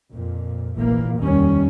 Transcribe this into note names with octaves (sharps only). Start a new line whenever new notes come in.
F2 A#2
F1 A#1 A#2 E3 A#3
F1 D#2 D#3 G3 C#4